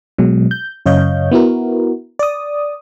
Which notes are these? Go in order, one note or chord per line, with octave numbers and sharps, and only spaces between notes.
B2 F#3 G#3
G6
F#2 C#3 C#5 D#5 F5 G6
B3 E4 F#4 A#4
D5 D#6